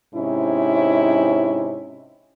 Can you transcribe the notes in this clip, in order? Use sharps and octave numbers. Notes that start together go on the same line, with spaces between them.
G#2 C3 C#4 D#4 E4